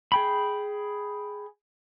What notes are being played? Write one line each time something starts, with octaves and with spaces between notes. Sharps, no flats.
G#4 G5 B5